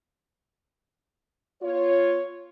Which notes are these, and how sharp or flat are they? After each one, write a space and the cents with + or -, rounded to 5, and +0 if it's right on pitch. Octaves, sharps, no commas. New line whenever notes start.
B3 -5 F4 +0 C#5 +0